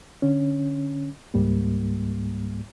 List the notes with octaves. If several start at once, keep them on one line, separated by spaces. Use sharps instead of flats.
D3 C#4
C#2 G#2 G3 A#3